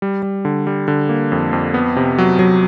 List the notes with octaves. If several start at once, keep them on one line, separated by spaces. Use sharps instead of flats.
G3
G3
D3
G3
D3
A#3
F2
F2
B3
C3
F#3
F#3